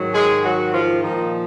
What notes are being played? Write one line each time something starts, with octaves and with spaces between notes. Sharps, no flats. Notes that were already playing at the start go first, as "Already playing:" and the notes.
Already playing: G#2 D#3 F#3
G#3 G#4
F#3 F#4
F3 F4
A#2 D#3 F3 D#4